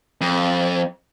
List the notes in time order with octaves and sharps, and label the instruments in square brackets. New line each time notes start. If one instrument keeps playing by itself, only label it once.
[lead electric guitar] F2